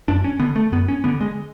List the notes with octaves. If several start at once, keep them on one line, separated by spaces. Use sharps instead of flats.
F#2 D4
C#4
D3 B3
A3
F#2 B3
C#4
D3 B3
G#3